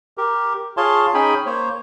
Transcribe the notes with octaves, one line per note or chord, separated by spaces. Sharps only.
G4 A#4
F4 G#4 C#5 F5 A5 C6
C#4 D#4 G#4 G5 G#5 B5
A#3 C5 C#5